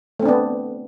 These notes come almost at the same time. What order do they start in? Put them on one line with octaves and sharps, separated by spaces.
A3 C4 D4 B3